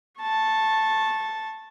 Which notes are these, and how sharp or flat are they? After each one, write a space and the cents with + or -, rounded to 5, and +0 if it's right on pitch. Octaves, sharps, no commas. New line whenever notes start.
A5 +0 C#6 -25